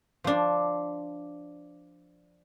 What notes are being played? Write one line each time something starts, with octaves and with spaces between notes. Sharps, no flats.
F3 D4